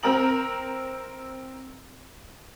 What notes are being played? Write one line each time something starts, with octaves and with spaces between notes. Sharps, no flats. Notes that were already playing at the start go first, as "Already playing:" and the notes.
C4 A#4 A#5 F#7